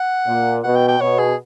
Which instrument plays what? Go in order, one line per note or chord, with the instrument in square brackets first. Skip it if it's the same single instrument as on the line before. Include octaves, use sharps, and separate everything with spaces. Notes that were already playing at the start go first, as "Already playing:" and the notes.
Already playing: [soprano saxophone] F#5
[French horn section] A#2
[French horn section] B2 [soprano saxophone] F#5
[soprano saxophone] G5
G5
[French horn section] B2 [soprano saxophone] C#5
[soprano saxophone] G#4